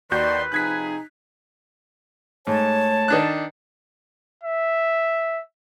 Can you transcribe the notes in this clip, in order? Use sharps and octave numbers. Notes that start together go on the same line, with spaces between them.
D#2 D#3 F#4 B4 D5 C6 G6
C3 F3 D#4 G#4 F#6 G#6 B6
G#2 A3 C#5 A5
D#3 D4 F#6
E5